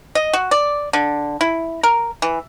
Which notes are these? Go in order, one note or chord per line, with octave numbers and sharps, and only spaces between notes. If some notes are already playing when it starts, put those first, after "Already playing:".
D#5
F#4
D5
D3
E4
A#4
E3